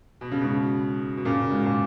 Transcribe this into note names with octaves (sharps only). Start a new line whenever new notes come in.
B2
C#3
G#2 B2
B2
A#2 C#3
G#2 B2
A#2